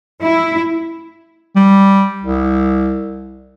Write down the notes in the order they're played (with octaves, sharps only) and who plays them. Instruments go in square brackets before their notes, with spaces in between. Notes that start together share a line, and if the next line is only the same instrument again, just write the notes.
[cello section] E4
[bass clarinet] G3
C2